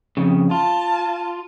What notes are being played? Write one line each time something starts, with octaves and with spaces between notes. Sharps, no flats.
F2 C#3
F4 A5